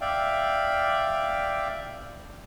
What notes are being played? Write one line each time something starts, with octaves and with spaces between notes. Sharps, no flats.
D5 E5 F5 G5